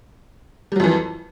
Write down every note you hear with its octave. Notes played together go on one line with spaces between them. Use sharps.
F2 E3 F#3 G3